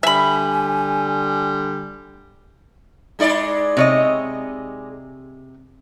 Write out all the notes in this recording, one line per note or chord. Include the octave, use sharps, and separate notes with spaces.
D3 G3 E5 G#5 B5
G#3 D#4 D5
C3 C#5 D#5